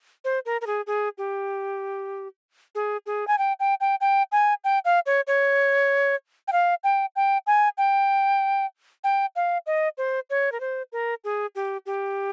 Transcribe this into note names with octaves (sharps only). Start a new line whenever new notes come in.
C5
A#4
A#4
G#4
G#4
G4
G#4
G#4
G#5
G5
G5
G5
G5
G#5
G5
F5
C#5
C#5
G5
F5
G5
G5
G#5
G5
G5
F5
D#5
C5
C#5
A#4
C5
A#4
G#4
G4
G4